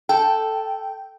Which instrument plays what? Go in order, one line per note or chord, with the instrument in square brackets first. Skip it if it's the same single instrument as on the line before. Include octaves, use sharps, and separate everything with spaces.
[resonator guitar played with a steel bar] A4 [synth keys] G5